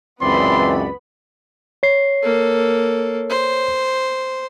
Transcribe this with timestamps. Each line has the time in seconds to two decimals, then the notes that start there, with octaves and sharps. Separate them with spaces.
0.22 C#2 F#2 E3 B3 C4 D5 B5 C6
1.83 C#5 C7
2.23 A#3 A4
3.30 C5